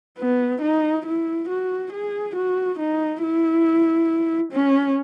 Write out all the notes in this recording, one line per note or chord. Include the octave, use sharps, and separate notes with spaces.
B3
D#4
E4
F#4
G#4
F#4
D#4
E4
C#4